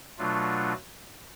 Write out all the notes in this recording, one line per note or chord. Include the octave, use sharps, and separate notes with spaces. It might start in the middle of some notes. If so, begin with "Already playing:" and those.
B2 F#3 A3 D4 F4